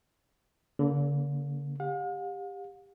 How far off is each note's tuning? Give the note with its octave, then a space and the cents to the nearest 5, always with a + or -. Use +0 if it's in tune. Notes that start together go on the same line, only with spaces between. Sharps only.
D3 -45 A#3 +5
G4 +20 F5 +45